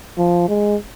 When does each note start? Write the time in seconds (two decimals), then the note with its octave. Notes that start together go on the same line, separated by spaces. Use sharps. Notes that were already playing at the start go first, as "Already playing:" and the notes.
0.17 F3
0.49 G#3